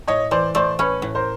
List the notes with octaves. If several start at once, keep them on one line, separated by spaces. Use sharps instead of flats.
A2 C#5 D#5
E3 C5 D5
A3 C5 D5
C#4 B4 C#5
A2
A#4 C5